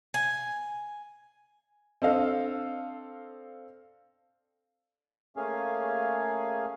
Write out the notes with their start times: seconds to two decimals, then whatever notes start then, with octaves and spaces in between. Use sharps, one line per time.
0.14 G#5
2.02 C4 D4 A4 D#5 F5
5.37 A3 A#3 C#4 G#4 F5 G#5